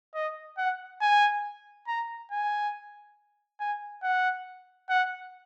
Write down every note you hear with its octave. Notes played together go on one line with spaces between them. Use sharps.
D#5
F#5
G#5
A#5
G#5
G#5
F#5
F#5